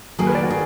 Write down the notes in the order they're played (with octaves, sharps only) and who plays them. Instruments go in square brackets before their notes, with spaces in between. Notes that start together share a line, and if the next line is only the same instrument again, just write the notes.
[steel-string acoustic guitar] D#3 F#3 A#3 [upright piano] G#4
[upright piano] B4
D5
F#4
[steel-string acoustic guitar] D#3 [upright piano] G#4